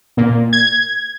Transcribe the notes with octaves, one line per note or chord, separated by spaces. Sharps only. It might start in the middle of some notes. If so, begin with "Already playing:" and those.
A#2
G#6